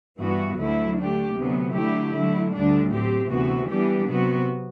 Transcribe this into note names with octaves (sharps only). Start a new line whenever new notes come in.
G2 E3 B3 F#4
D2 D3 F#3 A3 E4
D3 A3 D4 G4
D2 C3 F#3 B3
D3 F#3 A3 E4 G4
D3 F#3 A3 E4
D2 D3 G3 D4
A2 F#3 C4 G4
D2 C3 E3 B3 F#4
E3 G3 B3 D4 G4
C3 F#3 B3 F#4